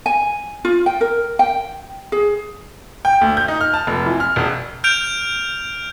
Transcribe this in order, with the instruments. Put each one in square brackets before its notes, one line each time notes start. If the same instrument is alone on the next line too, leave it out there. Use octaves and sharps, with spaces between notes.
[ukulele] G#5
F4
G5
A#4
G5
G#4
[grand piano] G5
D2
G6
D#4
F6
A5
F1
E3
F6
E1
[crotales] F6 G6 D7 F7